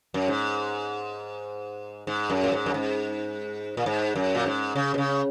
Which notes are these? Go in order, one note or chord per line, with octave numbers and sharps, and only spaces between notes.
F#2
G#2
G#2
F#2
A#2
G#2
F#2
G#2
A#2
G#2
F#2
A#2
G#2
C#3
B2
C#3